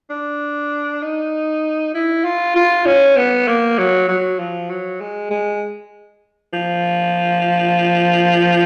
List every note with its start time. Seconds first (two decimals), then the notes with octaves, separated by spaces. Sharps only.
0.10 D4
1.03 D#4
1.94 E4
2.24 F4
2.56 F4
2.86 C#4
3.17 B3
3.48 A#3
3.78 F#3
4.08 F#3
4.39 F3
4.70 F#3
5.01 G#3
5.30 G#3
6.53 F3